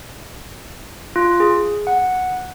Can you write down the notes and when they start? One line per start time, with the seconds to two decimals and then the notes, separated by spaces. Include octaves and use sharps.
1.16 F4
1.40 G#4
1.87 F#5